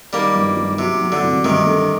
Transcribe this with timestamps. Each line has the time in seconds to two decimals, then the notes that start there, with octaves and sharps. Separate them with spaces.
0.13 D#3 G3 A#3
0.35 G1
0.57 G1
0.78 C3 F#3
1.01 F#3
1.12 D3
1.23 C2
1.44 G2 C3 D#3
1.66 D3